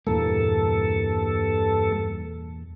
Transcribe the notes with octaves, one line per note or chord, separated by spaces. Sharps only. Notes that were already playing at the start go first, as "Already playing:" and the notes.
E2 G2 A#2 A#3 A4